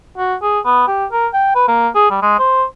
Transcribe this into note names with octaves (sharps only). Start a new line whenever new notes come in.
F#4
G#4
B3
G4
A#4
G5
B4
A#3
G#4
G3
G#3
C5